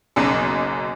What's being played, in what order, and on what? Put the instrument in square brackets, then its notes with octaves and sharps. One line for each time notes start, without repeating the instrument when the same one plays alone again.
[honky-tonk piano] F#1 B1 F#2